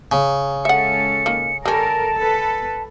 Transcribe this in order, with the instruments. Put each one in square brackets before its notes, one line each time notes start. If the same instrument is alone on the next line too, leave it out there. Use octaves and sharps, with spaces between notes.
[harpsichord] C#3
[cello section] G#3 C#4 A4 [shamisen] E5 F#5 [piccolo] C#7
[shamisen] D#3 A#3
[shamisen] G3 C#4 [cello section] A4 A#4 [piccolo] A5
[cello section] A4 B4